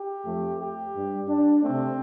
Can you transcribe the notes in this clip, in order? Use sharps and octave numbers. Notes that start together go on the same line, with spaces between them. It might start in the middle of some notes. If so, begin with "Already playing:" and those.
Already playing: G4
F2 F3 A3
G4
G2 G3
D4
C3 A3 C4